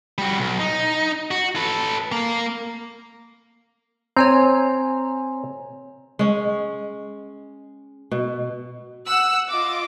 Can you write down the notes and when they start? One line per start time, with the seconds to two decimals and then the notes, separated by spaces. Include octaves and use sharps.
0.18 G3 F#4
0.39 B1
0.59 D#4
1.31 F#4
1.56 A4 B4
2.12 A#3
4.17 C4 C#5 G#5 A#5
6.19 G#3 C#4
8.11 B2
9.05 F#5 E6 F#6
9.49 F4 D#5 D6